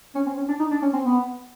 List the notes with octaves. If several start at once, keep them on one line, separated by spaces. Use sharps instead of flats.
C#4
C4
C#4
D4
D#4
D4
C#4
C4
B3